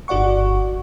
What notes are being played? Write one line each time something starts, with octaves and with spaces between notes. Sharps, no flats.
G1 F#4 D5 F#5 C#6